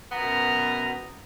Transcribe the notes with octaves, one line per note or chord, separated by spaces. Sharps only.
F#2 B2 B3 A#5